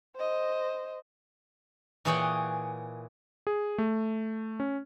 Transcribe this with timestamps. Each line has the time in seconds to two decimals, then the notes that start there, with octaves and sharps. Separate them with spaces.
0.16 C5 D#5
2.05 A#2 E3 G#4 C#5 F#5 G5
3.47 G#4
3.78 A3
4.60 C#4